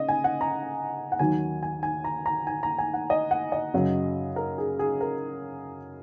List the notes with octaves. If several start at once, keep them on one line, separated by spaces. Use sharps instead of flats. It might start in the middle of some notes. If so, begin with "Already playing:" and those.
Already playing: C#3 D#5
G#5
F#5
A#5
F#5
D#2 D#3 F#3 G#5
G#5
G#5
A#5
A#5
G#5
A#5
G#5
F#5
D#5
F#5
D#5
F#2 C#3 F#3
A#4
G#4
G#4
A#4